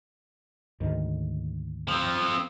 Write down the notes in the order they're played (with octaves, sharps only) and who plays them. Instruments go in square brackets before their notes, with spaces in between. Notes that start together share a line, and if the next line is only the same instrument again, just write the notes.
[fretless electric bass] D2 G#2 D#3
[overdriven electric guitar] F3 C4